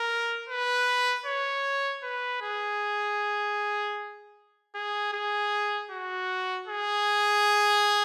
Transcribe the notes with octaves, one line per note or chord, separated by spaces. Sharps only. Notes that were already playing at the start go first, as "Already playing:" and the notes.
Already playing: A#4
B4
C#5
B4
G#4
G#4
G#4
F#4
G#4